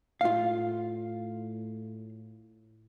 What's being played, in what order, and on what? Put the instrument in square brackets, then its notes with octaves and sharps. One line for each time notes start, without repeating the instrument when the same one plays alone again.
[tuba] A2 [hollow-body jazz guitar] F4 F5